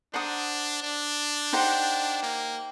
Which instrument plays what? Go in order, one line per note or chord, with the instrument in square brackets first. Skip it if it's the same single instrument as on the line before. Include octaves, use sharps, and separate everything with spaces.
[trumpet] D4 [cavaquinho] C5 F#5 A#5 D#6
[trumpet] D4
[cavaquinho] D#4 G4 C5 F#5
[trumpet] A#3